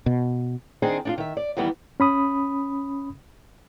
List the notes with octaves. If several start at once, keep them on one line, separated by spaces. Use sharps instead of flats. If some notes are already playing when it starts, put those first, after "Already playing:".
B2
D#3 C4 D4 D#4 G#4 C5
D4 D#4 F4
D#3 E5
D5
E2 D#3 E3 G3 B3
C#4 B5 D#6